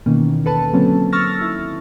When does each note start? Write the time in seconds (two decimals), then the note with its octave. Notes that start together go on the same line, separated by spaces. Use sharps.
0.06 B2 D#3 E3 A#3 C#4
0.45 D#2 A4 B4 A5
0.73 D3 F#3 A#3 C4 C#4
1.12 C#6 E6 F6 A6 A#6
1.39 D#3 E4